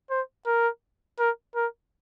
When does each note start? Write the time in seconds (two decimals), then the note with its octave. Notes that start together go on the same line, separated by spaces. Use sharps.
0.11 C5
0.47 A#4
1.19 A#4
1.56 A#4